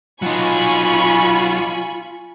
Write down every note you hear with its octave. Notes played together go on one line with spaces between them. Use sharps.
F#3 D#4 F4 G#5 B5 C#6